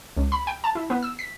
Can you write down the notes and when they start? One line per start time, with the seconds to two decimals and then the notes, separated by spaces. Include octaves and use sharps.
0.17 C#2
0.32 B5
0.47 G5
0.64 A5
0.75 E4
0.90 B3
1.03 E6
1.19 B6